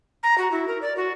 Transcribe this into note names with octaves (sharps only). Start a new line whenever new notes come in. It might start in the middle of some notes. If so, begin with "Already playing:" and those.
A#5
F#4
E4
A#4
D5
F#4